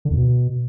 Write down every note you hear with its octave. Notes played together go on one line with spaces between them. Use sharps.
D3
E2
B2